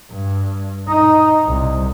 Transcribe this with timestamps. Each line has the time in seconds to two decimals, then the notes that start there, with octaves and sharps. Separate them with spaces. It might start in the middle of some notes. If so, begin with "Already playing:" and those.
0.12 G2
0.88 D#4
1.47 C2